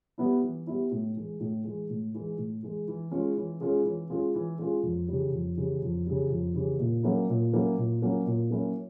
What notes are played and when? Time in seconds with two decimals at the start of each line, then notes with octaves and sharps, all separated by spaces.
0.18 G3 B3 E4
0.43 E3
0.67 G3 B3 E4
0.91 A2
1.16 E3 G#3
1.40 A2
1.64 E3 G#3
1.90 A2
2.14 E3 G#3
2.38 A2
2.63 E3 G#3
2.88 E3
3.11 G#3 C#4 F4 G#4
3.37 E3
3.61 G#3 C#4 F4 G#4
3.85 E3
4.10 G#3 C#4 F4 G#4
4.35 E3
4.59 G#3 C#4 F4 G#4
4.83 F2
5.08 C#3 E3 G3
5.32 F2
5.57 C#3 E3 G3
5.82 F2
6.06 C#3 E3 G3
6.30 F2
6.54 C#3 E3 G3
6.80 A#2
7.03 F#3 A#3 C#4 E4
7.29 A#2
7.53 F#3 A#3 C#4 E4
7.77 A#2
8.02 F#3 A#3 C#4 E4
8.26 A#2
8.50 F#3 A#3 C#4 E4